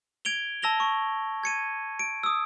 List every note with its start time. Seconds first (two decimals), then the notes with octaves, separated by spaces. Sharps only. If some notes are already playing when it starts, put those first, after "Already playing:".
0.25 G#6 D7 F7 G7
0.62 A5 E6 A#6 F7 G7
0.80 C#6
1.43 G#6 C#7 D#7
1.99 D7
2.23 D#6 E6